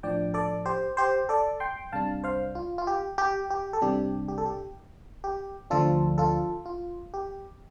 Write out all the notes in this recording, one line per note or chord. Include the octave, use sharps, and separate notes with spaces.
A2 F3 D4 D5 G5
A4 D5
G4 C5
G4 C5
A4 D5
G5 C6
C2 C3 G3 D4 F5 A5
C5 F5
F4
F4
G4
G4
G4
A4
C2 C3 G3 D4 G4
G4
A4
G4
G4
D2 D3 F3 D4 F4 A4
F4 A4
F4
G4